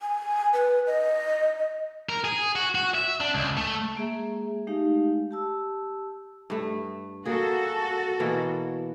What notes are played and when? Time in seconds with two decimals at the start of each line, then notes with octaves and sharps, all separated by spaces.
0.01 G#5
0.53 B4
0.87 D#5
2.09 A#4
2.25 G#4
2.56 F#4
2.75 F#4
2.95 E5
3.21 D4
3.34 C#2
3.57 A3
3.95 G#3 A#3 G#4 E5
4.67 G#3 A3 D#4 G4 F5
5.31 G4 A5 E6
6.50 G2 A3
7.25 A#3 F#4 G#4 A4
8.20 B2 E3 A#3